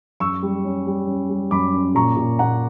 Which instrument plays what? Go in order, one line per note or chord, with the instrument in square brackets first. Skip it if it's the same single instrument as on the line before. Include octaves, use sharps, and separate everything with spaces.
[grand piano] F#2 C#6 E6
G3
C#4
G3
C#4
G3
F#2 B5 D6
C#4
A#2 A#5 C#6
A#2
A#2 F#5 A#5